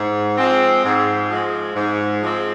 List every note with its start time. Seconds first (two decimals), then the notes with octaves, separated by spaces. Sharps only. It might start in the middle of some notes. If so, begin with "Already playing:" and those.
Already playing: G#2
0.37 F3 G#3 C4
0.84 G#2
1.30 F3 G#3 C4
1.76 G#2
2.22 F3 G#3 C4